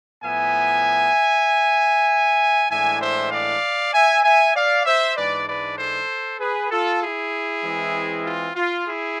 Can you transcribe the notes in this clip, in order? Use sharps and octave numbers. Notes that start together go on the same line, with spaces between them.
A2 F3 B3 E5 G#5
A2 E3 G#3 D4 E5 G#5
C5 E5
D5 F5
E5 G#5
E5 G#5
D5 F5
C5 E5
G#2 E3 G#3 D4 B4 D5
B4 D5
A4 C5
G#4 B4
F4 A4
E4 G#4
E3 G#3 C4
F4
F4
E4 G#4